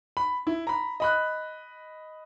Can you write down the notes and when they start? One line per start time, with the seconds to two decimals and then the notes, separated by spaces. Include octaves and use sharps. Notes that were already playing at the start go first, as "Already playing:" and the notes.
0.17 B5
0.47 E4
0.67 A#5 B5
1.00 D#5 B5 F#6